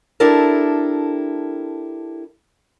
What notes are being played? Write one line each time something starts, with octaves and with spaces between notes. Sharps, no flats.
D4 E4 G4 A4 A#4